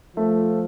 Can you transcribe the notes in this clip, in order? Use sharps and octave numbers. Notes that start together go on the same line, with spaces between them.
F3 A3